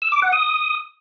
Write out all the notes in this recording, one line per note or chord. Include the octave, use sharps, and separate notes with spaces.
E6
D6
F#5
D#6